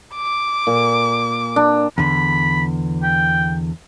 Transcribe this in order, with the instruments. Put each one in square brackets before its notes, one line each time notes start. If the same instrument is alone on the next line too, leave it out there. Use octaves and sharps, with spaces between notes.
[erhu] D6
[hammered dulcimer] A#2
D4
[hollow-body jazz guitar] E2 D3 [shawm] B5
[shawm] G5